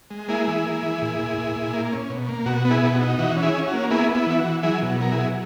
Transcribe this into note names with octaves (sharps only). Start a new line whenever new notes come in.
G#3
A#3 E4 G#4
E3
A#3
E3
A#2
A#2
A#2
A#2
A#3
C#4
B2
A#3
B2 F#4
B3
E4 G#4
B2
F#4
D#4
E3 F#4
C#4
E4 G#4
C#4
F#4
A#3
B3 E4 G#4
B3
E4
E3 E4
F#4
E3
F#3 E4 G#4
B2
F#3 A#4
E4 G#4
F#3